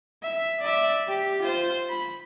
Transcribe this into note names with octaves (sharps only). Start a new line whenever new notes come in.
E5
D5 E5
G4
F4 C5
B5